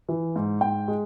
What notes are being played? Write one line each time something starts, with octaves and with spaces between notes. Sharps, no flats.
E3
G#2
G#2 G5
G#3